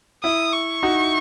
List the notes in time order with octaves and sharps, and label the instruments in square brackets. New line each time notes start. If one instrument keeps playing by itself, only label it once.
[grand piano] E4 [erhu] D#6
[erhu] C#6
[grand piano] D#4 F#4